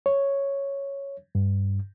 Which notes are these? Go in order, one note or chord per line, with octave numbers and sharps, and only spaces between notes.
C#5
G2